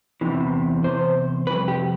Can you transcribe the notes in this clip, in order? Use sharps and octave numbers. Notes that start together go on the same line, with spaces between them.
E2 C3 E3
E2 C3 C5
F2 C3 G3 B4
G4